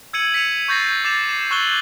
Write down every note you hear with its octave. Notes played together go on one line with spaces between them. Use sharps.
E6 G#6 C#7 D#7 F#7
B6 C#7 D#7 F7
C#6 G6 A6 A#6 C7
D6 A6 C7 E7 F7
C7 E7
C#6 E6 F#6 G6 F#7 G7